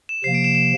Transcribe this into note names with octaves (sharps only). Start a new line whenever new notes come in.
E7
C3 F3 A#3 C7
D7
E7
E7